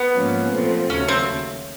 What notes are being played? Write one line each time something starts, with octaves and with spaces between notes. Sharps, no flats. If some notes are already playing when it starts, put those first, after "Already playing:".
Already playing: B3
G#2 F3 A#3 C#4
A#2 F3 A3 C4
D#2 C#3 F#3 A3 C#4
C4